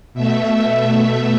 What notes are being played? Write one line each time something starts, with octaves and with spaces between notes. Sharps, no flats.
B2 A3 E5